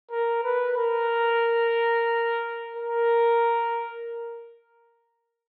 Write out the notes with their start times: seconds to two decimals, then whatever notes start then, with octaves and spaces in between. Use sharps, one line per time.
0.11 A#4
0.44 B4
0.77 A#4
2.76 A#4